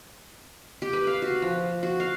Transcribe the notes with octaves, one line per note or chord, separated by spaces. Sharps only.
G4
B4
F5
F#4
F3
F#4
F5